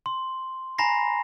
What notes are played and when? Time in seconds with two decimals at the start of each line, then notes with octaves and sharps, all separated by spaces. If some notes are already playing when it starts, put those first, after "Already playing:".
0.06 C6
0.78 G#5 A#5 B5 A#6 C7